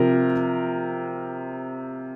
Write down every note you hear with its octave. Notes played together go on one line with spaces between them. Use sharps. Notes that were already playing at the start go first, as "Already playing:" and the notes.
Already playing: C3 F3 A#4